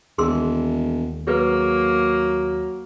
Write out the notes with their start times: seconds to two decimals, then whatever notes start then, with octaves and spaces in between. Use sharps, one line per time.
0.18 E1 D#2 G#4 C6 E6
1.27 F#3 A#3 G#4 B4